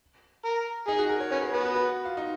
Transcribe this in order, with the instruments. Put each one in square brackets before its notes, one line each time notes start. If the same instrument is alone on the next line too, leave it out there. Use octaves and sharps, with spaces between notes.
[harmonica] A#4
[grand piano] D#4 [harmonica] G#4
[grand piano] F#4
A#4
C#5
[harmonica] C#4 [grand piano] B4
[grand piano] G#4
[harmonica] B3 [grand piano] F#4
[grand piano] F#4
F#4
F4
D#4